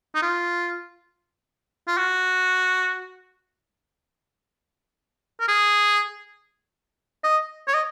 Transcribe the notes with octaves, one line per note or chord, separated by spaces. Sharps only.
D#4
F4
F4
F#4
A#4
G#4
D#5
C#5
D#5